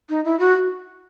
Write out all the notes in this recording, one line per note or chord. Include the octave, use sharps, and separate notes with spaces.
D#4
E4
F#4